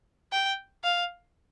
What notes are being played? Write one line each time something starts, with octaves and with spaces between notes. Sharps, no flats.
G5
F5